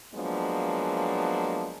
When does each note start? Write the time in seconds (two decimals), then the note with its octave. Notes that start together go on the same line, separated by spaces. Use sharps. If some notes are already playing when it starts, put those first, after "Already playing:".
0.14 F3 F#3 G#3 A#3 B3 D4